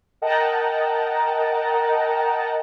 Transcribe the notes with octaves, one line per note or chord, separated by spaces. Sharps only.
A#4 D#5 F#5 G5 A5 A#5